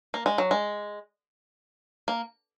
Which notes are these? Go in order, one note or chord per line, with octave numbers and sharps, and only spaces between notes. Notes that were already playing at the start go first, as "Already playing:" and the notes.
A#3
G#3
F#3
G#3
A#3